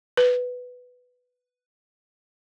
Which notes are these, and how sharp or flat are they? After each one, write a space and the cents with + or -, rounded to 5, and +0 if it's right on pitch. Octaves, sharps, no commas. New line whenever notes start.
B4 +5